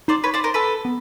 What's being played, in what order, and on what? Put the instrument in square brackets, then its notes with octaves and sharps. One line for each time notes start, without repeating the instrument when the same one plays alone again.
[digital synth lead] D#4 [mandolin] C5 D5
[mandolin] B4 C#5
C5 D5
A#4 C5
A4 B4
[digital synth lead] B3